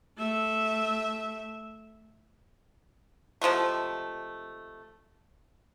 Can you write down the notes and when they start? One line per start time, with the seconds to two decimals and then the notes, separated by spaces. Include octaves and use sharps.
0.18 A3 E5
3.41 C3 F3 G#3 A3